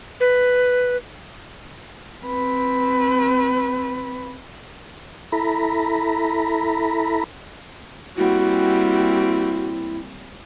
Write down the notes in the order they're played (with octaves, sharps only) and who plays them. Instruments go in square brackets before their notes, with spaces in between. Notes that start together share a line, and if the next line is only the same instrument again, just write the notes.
[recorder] B4
[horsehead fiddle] C4 B4
[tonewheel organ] E4 A4 A#5 B5
[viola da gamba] G3 A#3 C4 [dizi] E4 [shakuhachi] F#4